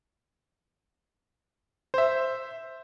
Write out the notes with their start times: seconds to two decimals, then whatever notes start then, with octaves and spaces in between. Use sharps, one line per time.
1.94 C5 E5